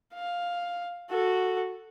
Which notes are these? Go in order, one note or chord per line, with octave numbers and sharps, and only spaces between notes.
F5
F#4 A4